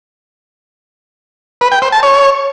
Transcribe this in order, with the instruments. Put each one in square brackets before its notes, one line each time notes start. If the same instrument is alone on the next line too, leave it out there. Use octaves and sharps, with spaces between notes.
[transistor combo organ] B4
G5
C5
A5
C#5